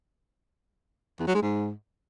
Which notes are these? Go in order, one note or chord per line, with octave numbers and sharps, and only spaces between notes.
E2
F#3
G#3
G#2